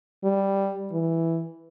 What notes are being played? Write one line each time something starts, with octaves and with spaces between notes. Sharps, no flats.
G3
E3